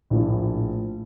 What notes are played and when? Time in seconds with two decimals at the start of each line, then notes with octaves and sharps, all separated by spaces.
0.10 A#1 A2 F3